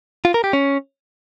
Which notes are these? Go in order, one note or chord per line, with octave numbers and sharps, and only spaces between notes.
F4
A#4
G4
C#4